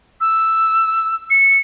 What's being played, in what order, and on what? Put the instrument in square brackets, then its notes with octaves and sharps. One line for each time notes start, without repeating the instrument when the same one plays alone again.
[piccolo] E6
C#7